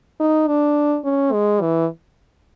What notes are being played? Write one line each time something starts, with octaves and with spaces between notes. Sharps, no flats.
D#4
D4
C#4
G#3
E3